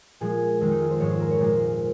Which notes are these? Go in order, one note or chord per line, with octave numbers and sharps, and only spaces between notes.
A#2 F3 G#3 G#4
F2 D#3 G#3
D#4
F4
C5
G#2 F3 G#3 C#5
C5
A#4
C#5
A#2 F3 G#3 C5